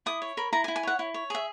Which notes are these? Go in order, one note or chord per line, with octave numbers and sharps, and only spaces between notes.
E4 D#6
C#5
A#4 B5
E4 A#5
G#5
E4
G#5
C#5 F#5
E4
C#5
G#4 E5